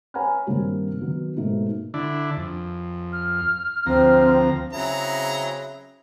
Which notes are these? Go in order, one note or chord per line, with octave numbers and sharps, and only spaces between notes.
C#5 F#5 G#5 A#5 B5 F6
G2 C3 D#3 G3 A#3
D#3 F#3 B3
G#2 B2 A3 A#3 D#4
D3 D4 E4
F2
F6
D2 F3 C4 A#5
C#3 F#3 C4 E4 G#4 E5 A#5